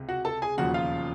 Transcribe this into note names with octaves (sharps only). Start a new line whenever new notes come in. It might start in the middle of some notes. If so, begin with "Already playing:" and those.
Already playing: C#2 C3
F#4 F#5
A4 A5
G#4 G#5
E1 D#2 C#3 F3 F#4 F#5
F4 F5